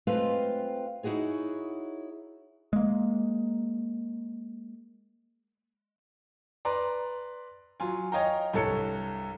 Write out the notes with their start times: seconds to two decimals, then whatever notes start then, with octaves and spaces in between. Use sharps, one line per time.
0.07 G#3 A3 C4 F4 B4 F5
1.03 D#4 E4 F#4 G#4 C#5
2.73 G#3 A#3
6.65 B4 D5 A#5 C6
7.80 F#3 F4 G#5
8.12 C#5 D#5 F5 G5 A#5
8.53 C2 G2 A4 C#5 C#7